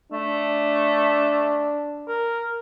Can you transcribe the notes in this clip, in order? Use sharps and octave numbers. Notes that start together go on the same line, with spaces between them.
A3 D4
A#4